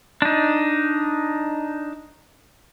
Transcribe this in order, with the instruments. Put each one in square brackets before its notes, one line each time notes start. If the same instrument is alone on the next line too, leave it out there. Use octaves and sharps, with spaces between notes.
[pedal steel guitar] D4 D#4